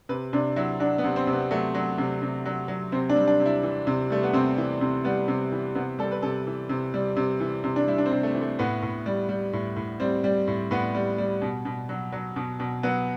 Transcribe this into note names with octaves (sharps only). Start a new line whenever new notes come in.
C3 B4
C3 D4
F#3 E4
F#3 D4
B3
C3
C4
C3
B3
F#3 A3
F#3
C3
C3
F#3
F#3
C3 C4
D4
G3
D4
C3
E4
E3
C3
G3 A3
B3
C3 C4
E3
C3
G3 B3
C3
E3
C3 B3
G3 A4
B4
C3 A4
E3
C3
G3
C3
E3
C3
D4
G3 E4
D4
C4
C3
A3
E3
A3
A2 B3
A2
G3
G3
A2
A2
G3 C4
G3
A2
A2 B3
G3
G3
B2
B2
F#3
F#3
B2
B2
F#3 B3